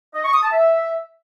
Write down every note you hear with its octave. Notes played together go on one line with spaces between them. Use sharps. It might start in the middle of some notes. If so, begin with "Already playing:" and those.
D#5
C#6
D#6
A5
E5